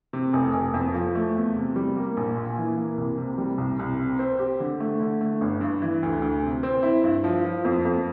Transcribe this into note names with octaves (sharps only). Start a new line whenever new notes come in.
C3
F1
F1
F2
F3
A3
E2
C3
G3
A#3
A#1
A#2
E3
A#3
C2
C3
G3
C2
C2
C3
C4
G4
D3
A3
D3
A3
G1
G2
E3
D2
D2
C3
C4
E4
G2
F3
F3
F2
F2